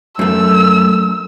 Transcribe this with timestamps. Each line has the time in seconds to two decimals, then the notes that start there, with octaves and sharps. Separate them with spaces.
0.19 F#2 A3 E6